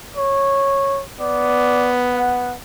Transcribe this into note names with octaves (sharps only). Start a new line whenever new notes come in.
C#5
B3 D5
F#5